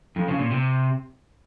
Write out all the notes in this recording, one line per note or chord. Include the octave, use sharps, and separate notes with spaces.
F2
C#3
A#2
C3